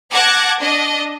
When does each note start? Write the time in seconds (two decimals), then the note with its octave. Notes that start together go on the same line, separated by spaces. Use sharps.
0.11 F#5 A5 D6 F#6 G#6 A#6
0.60 D4 D#5